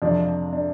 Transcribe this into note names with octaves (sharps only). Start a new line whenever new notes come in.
F2 C3 F3 D4
D4